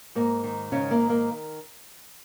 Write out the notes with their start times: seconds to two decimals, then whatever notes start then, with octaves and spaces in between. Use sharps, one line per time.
0.15 G#2 A#3
0.44 D#3
0.72 G#2 C#3 C#4
0.91 A#3
1.00 D#3
1.10 A#3